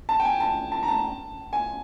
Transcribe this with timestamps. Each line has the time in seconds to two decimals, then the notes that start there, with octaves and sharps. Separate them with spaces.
0.09 A5
0.20 G5
0.25 G#5
0.40 A5
0.72 A5
0.83 A#5
0.88 A5
1.53 G#5